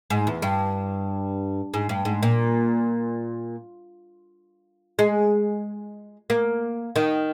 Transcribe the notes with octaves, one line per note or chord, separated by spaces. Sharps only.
G#2
E2
G2
G#2
G2
G#2
A#2
G#3
A#3
D#3